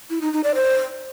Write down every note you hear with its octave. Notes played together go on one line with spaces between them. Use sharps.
E4
D#4
D#4
D5
C5